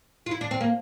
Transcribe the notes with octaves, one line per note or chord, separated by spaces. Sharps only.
F4
E4
D4
C4
A#3